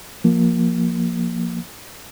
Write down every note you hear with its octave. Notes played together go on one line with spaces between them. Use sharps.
F3 A#3